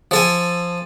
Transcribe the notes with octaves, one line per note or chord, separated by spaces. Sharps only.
F3 A4 G#5